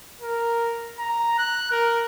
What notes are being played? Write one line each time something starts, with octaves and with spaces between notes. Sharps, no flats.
A#4
A#5
F#6
A#4